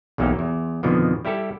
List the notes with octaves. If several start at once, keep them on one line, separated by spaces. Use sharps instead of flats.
B1 E2 F#3 A#3 D#4 G4
E2
F2 B2 D3 D#3 F3
G3 E4 G4 A4